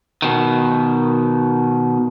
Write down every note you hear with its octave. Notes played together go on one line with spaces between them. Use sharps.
B2 D#3